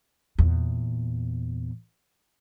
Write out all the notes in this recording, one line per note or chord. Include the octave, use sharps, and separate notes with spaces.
E2 A#2